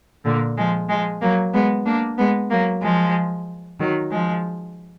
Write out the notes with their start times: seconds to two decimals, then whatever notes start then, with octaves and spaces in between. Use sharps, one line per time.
0.25 A#2 D3
0.57 F3 G#3
0.89 F3 G#3
1.21 F#3 A#3
1.53 G#3 B3
1.86 A#3 D4
2.18 G#3 B3
2.51 F#3 A#3
2.82 F3 G#3
3.79 D#3 F#3
4.11 F3 G#3